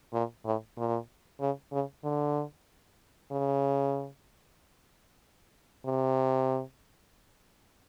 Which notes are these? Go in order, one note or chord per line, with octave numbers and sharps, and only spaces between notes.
A#2
A2
A#2
C#3
C#3
D3
C#3
C3